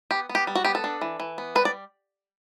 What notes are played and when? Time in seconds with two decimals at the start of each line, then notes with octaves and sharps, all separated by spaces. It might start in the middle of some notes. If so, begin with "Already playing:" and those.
0.11 B3 G4
0.29 B3
0.35 G4
0.47 G3
0.55 F#4
0.64 B3 G4
0.75 A4
0.84 D4
1.01 E3
1.20 E3
1.38 B3
1.55 G3 B4
1.65 D5